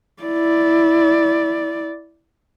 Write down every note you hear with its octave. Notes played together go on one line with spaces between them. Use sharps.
E4 D5